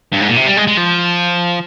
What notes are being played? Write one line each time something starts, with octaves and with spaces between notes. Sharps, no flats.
G2
G#2
A#2
C3
G3
G#3
G#3
F3